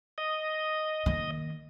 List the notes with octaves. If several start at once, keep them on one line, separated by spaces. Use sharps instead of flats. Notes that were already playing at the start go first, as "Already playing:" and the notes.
D#5
D#3 A#3